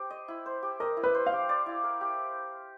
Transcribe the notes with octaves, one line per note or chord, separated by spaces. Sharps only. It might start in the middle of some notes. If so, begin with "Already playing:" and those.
Already playing: G4 C5
D#5
E4
C5
G4
A#4 D#5
E4
B4
C5
F5
G4
D5
E4
A#4
G4